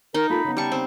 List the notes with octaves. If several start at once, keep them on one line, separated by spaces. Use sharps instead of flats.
D#4 A#4
A#3 F4 A4 B5
C#3 B3
G3 A5 C#6
C4